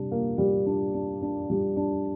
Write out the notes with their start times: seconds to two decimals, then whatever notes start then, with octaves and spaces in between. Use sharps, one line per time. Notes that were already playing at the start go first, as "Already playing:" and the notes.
Already playing: C3 G3 D4
0.11 A#3
0.38 G3
0.66 D4
0.94 D4
1.22 D4
1.50 G3
1.77 D4